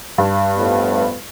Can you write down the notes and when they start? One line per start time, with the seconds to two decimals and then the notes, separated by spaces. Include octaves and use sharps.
0.18 G2
0.57 F2 A2 B3